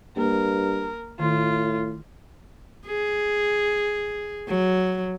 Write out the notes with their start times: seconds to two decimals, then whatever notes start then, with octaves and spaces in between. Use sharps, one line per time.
0.17 G2 A#3 A#4
1.20 A2 D#3 F4
2.87 G#4
4.48 F#3